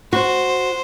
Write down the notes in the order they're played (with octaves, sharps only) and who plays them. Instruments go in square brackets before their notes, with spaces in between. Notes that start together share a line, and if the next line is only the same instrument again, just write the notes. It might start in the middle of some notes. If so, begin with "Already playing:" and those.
[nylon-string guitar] F#4 [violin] C5